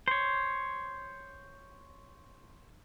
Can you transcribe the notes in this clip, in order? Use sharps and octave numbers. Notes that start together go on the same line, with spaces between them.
C5 C#5